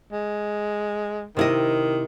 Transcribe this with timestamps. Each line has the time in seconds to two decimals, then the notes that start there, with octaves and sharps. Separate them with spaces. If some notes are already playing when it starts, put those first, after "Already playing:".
0.12 G#3
1.37 C3 D#3 E4 D#5